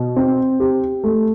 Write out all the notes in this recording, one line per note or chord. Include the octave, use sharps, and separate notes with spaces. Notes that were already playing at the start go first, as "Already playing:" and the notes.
Already playing: B2
C4
G4
A3